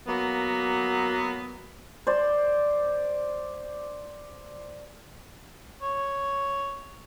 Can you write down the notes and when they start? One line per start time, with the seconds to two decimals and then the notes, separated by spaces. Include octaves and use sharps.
0.08 F#3 A#3 B3
2.07 C5 D5
5.82 C#5